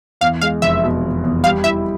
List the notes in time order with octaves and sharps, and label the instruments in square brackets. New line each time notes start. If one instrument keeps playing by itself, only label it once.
[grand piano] E2 [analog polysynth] F5
[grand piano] G#3 [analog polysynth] F5
[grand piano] F1 [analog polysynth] E5
[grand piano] B2
E2
E2
[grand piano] G3 [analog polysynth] F5
[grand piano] E4 [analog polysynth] E5